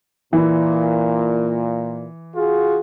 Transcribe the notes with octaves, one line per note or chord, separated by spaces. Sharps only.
A#2 E3
F4 F#4 G#4